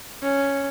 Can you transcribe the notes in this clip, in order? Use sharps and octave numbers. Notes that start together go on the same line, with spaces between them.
C#4